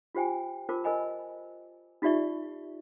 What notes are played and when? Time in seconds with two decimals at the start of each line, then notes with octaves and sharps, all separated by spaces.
0.15 F4 G4 C5 G5 G#5
0.69 F4 A#4 C5 A5 D6
0.84 A#4 C5 D#5 G#5 B5
2.02 D#4 F4 G4 D5 E5 C#6